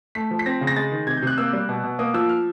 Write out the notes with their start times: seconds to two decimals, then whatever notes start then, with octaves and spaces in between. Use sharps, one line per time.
0.15 A3 B6
0.31 F3
0.39 B6
0.46 C4 A#6
0.61 C#3
0.67 A#6
0.76 G#3 A6
0.92 D#3
1.07 C3 G#6
1.17 G6
1.22 C3 F#6
1.38 A#3 E6
1.53 G3
1.69 B2
1.84 B2
1.99 A#3 D#6
2.14 F3 E6
2.29 F6